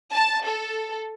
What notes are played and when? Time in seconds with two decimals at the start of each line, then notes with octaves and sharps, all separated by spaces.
0.13 A5
0.46 A4